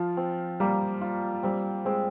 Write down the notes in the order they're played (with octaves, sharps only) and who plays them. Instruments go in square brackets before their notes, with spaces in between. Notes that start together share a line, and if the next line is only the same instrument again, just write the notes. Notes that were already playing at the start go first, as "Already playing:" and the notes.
Already playing: [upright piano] F3 [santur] F4
[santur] C4
[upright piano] G3 [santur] A#3
[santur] F4
[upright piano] G3 [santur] C4
[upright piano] G#3 [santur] C4